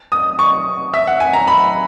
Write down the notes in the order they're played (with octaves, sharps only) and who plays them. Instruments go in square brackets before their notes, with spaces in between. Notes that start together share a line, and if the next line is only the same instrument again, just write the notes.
[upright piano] D#6
C#6
E5
F#5
G#5
A#5
B5